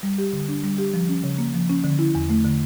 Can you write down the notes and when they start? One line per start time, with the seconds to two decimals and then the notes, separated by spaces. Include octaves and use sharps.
0.03 G3
0.18 G4
0.33 D3
0.48 D4
0.64 G3
0.78 G4
0.94 F3
1.09 C#4
1.23 C#3
1.38 A#3
1.54 F3
1.70 C#4
1.84 D3
1.99 E4
2.15 E2
2.30 A3
2.45 D3